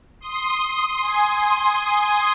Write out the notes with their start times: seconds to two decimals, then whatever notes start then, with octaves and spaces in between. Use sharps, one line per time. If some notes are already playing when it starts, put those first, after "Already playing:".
0.19 C6 D#6
1.00 G#5 C6